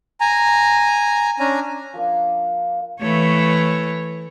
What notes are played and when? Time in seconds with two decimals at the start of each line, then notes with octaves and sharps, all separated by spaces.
0.21 G#5 A#5
1.40 C#4 D4 G#5 A#5
1.94 F3 A#3 D4
3.00 E3 A3 C#5